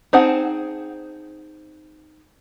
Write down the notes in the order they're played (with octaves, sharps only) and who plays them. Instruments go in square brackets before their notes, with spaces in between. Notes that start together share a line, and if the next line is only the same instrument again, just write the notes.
[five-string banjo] C4 D#4 G#4 F#5 A5